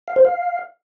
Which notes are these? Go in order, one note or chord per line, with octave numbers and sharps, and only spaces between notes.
F5
C5
F5